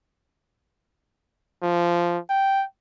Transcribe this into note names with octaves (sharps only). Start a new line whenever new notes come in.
F3
G5